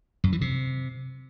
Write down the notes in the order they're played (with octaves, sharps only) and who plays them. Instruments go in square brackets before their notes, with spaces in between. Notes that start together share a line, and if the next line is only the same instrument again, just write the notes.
[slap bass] F#2
E3
C3